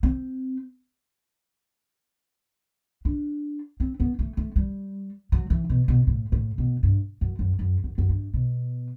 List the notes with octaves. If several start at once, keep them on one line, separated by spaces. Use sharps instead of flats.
C4
D4
C4
B3
A3
A3
G3
F#3
E3
B2
B2
A2
A2
B2
G2
F#2
F#2
F#2
F#2
F#2
G2
B2